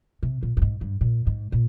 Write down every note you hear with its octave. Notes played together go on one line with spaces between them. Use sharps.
C3
A#2
G2
G#2
G2
A#2
G#2
A#2